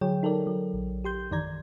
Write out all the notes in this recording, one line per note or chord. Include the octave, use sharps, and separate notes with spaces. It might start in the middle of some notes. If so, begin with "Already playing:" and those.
D3 F#3 G#4 C#5 G5
D#4 A4 A#4 D5
F#3
A#1
G4 C6 G6
F#2 D#3 E3 D5 A#5 G#6